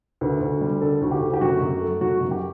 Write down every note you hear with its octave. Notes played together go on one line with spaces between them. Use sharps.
D2 B4
D2
G3
D3 A4
D2 F#4
G4
D2
G4
F#2 F#4
F#2
A3
F#3 F#4
F#2
G4